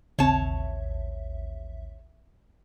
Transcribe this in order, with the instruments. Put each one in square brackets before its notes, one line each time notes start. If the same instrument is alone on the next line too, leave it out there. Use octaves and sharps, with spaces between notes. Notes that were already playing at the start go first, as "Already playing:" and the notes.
[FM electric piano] A1 D#2 E5 [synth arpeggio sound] C#3 C4 [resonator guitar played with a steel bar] C#5 A5